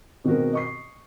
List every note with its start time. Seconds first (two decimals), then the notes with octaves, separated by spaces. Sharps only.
0.24 B2 D#3 G#3 C4 F#4 A#4
0.53 D#5 C#6 C7